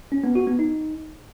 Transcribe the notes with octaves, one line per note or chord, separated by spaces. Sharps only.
C#4
B3
F#4
B3
D#4